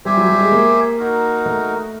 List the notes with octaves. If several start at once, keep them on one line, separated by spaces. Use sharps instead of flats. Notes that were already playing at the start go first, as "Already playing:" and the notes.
G3 G4 C5 E5 G#5
F#3
G3
G#3
A#3
D#4 F#4 A#4
A3